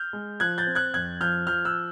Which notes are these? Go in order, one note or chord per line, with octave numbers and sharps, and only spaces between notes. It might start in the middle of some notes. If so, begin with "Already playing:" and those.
Already playing: F6 G6
G#3
F3 F#6 G#6
G6 A6
C4
F#6 G#6
F2 F#6 G#6
F3 F6 G6
F3 F6 G6
E6 F#6